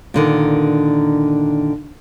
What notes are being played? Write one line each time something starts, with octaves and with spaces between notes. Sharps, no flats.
A#2 D3 D#3